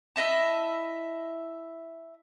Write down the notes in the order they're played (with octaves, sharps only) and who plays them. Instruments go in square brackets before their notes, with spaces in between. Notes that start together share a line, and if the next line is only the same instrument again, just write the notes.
[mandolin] E4 D#5 E5 A5